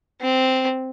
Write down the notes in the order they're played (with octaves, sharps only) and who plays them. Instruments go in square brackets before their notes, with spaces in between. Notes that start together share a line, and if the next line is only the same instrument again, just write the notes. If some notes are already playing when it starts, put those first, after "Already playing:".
[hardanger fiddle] C4